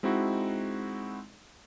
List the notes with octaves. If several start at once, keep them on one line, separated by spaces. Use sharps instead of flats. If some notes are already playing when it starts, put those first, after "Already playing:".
G#3 C4 D#4 E4 F#4